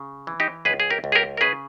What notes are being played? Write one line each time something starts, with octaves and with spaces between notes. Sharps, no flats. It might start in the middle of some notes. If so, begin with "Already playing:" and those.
Already playing: C#3
E3
D#4 G4
C#2 G#4 B4
G#4
G4 A#4
C#2
G#4
G4 A#4
A#4
C#3 G#4 B4